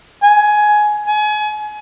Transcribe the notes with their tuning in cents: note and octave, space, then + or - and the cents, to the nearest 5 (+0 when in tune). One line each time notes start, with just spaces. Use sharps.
G#5 +15
G#5 +30